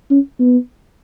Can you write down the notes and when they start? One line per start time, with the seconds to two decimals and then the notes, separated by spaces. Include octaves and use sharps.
0.10 C#4
0.39 B3